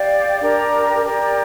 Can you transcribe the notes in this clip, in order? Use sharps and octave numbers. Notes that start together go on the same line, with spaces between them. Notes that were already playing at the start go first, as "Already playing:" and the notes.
Already playing: G4 D5 F5
D4 G4 A#4 D5
G4 A#4 D5